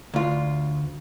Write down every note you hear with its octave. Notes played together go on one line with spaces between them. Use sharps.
D2 F4